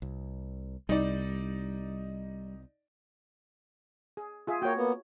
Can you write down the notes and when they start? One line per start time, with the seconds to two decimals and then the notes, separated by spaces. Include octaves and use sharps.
0.02 C2
0.89 C2 G3 D#4 D5
4.17 G#4
4.47 F4 G#4 E5
4.62 A#3 F#4 C#5 G5
4.76 A#3 B3